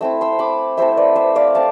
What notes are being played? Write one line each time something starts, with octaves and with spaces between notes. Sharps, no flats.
A3 C4 E4 E6
C6 E6
B5 D6
A3 C4 E4 C5 E5
B4 D5
C5 E5
D5 F5
A3 C4 F5 A5